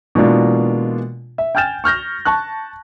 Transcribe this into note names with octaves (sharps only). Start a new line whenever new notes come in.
B2 E3 G#3 A#3 D4 F4
E5
G5 G#5 F6 G6 A6 E7
C#6 F6 G6 A#6
A5 C#6 F#6